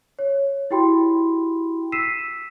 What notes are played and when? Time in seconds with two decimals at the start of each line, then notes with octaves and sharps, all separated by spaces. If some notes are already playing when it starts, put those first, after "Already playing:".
0.19 C#5
0.71 E4 F#4 G4 G5 B5 C6
1.92 E6 B6 C7 D#7 E7